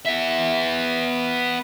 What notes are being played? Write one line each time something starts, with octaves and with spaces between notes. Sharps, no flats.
B3 E5